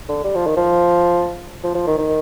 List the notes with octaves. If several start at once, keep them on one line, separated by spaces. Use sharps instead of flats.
D3
G3
F3
D#3
F3
F3
F3
D#3
D#3